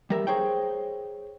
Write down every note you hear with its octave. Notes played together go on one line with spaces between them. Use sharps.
G3 A#4 E5
G#4 C5 C#5 G5